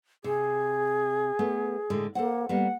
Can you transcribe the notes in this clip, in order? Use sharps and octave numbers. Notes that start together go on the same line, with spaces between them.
C3 G#4
A3 B3
A2 D3 G#3
A#3 A4 C5 F#5
G3 A#3 B3 F#5